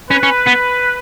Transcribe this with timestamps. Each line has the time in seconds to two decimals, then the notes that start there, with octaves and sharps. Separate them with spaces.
0.11 C#4 B4
0.23 C#4
0.47 B3